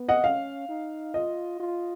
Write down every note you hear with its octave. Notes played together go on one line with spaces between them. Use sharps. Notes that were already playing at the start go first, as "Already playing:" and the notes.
Already playing: B3
D#5 F#5
C#4 F5
D#4
F4 D#5
F4